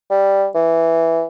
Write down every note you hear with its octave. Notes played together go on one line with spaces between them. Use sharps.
G3
E3